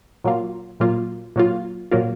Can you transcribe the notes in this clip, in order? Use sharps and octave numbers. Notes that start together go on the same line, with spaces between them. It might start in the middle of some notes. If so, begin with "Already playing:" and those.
A#2 F#3 A#3 F4
A#2 F#3 A#3 F4
A#2 F#3 A#3 F4
A#2 F#3 A#3 F4